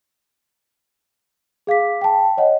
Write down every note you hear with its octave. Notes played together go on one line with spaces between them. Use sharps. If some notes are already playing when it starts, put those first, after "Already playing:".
G#4 F5 D6 B6
G5 A5
C#5 D#5 F#5